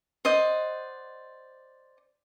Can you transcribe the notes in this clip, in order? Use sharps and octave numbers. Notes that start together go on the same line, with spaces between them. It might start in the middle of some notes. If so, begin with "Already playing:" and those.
C5 D5 D#5 F#5